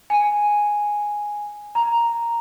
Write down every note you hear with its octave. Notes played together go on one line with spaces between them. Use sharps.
G#5
A#5